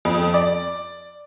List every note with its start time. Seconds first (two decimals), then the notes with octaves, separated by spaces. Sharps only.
0.05 F2
0.34 D5